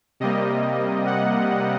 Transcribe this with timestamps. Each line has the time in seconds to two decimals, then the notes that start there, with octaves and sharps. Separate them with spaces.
0.20 C3 G3 A#3 D#5
1.06 F#5